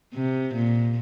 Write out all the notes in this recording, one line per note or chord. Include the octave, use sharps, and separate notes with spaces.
C3
A#2